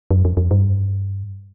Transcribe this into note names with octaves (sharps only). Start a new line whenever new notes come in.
F#2
F2
F2
G2